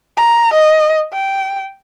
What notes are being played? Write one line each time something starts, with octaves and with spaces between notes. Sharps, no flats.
A#5
D#5
G5